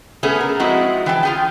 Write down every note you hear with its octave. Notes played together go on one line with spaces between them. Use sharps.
A3 B3 C#4 G#4 A4
A#4
F3 G#3 C4 E4 F#4
E3 G5 A5
F4 G#4 G5